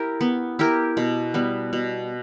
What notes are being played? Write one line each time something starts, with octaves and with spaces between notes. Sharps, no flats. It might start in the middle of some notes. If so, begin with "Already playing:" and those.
Already playing: E4 G4 A#4
B3
E4 G4 A#4
B2
G3 B3
B2